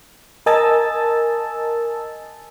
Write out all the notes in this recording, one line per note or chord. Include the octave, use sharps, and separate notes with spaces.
A#4 D#5 G#5 A5 E6 A6